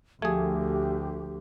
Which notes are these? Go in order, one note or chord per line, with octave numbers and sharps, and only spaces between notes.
D2 F3 A3 G4 G#4